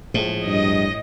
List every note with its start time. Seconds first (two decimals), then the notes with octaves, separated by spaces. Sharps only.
0.14 A#1 A2 F3 G#3
0.47 G2 D#5